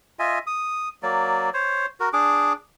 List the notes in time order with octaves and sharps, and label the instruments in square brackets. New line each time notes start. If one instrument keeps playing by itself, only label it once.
[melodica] F4 D#5 E5 G#5
D#6
F#3 A#3 D5
C5 C#5
F#4 A#4
D4 G#4 D6